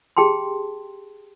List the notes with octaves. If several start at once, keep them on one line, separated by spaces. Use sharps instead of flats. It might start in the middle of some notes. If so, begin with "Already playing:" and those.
G4 G#4 G5 A5 C6